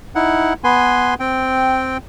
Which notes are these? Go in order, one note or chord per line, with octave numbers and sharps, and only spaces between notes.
D#4 E4 F#5
B3 B4 G#5 C6
C4 G5